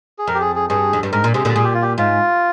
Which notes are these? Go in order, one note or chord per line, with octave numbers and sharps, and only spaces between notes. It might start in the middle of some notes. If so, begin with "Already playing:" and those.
G#4
F2 A#4
G4
G#4
G#4
G2 G#4
F2
G2
G#2 A#4
A#2
C3 G#4
A#2 D3
A#2 G#4
G4
F4
G4
G#2 F4